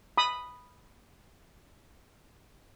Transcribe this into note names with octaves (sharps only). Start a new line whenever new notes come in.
B5 D#6